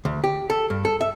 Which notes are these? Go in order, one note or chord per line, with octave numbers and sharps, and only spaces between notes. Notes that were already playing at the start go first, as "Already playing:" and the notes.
D2
G4
A4
G2
A4
E5